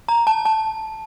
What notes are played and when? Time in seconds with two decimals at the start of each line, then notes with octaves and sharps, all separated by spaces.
0.08 A#5
0.27 A5
0.45 A5